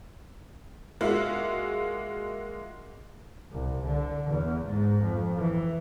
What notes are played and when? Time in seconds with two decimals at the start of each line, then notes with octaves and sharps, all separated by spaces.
1.01 G#3 A#3 F4 F#4 E5 F5
3.52 C2
3.86 D3
4.30 E2
4.65 G#2
5.03 F2
5.39 E3